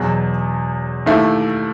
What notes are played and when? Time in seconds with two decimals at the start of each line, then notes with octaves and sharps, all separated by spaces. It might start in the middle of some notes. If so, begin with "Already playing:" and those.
Already playing: E2 B2 F#3
1.06 D#2 D#3 A3 E4